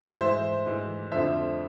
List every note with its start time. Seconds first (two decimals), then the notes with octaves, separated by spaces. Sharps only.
0.21 G#2 E3 C5 E5
0.66 G#2 E3
1.11 F2 D3 F3 C5 E5